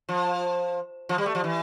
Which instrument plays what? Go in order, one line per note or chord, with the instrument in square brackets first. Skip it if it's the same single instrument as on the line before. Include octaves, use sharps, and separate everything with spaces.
[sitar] F3
F3
G3
A3
F3
E3